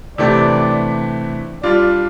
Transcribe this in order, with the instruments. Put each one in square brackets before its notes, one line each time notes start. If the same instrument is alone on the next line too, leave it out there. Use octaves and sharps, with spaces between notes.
[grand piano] C3 E3 A3 D4 G4 [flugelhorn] D5
[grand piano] G3 D4 F4 [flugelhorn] D5